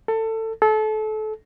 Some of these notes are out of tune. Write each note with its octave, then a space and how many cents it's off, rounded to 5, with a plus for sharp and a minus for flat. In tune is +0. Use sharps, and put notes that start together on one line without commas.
A4 +20
A4 -30